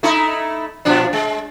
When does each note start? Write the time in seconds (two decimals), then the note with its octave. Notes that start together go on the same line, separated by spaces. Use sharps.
0.03 A3 D#4 E4
0.85 A#2 F3 D4
1.13 G#3